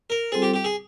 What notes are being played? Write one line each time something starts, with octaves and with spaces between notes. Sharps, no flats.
A#4
G3 C4 F4 G#4 A4 C5
G4
G4
G#4